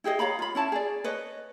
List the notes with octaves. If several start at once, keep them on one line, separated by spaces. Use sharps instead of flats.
E4 G4 G#4 D#5
C#5 F5 A#5 B5
F4 B5
C#4 E4 A5
G#4 D5
B4 C#5 D#5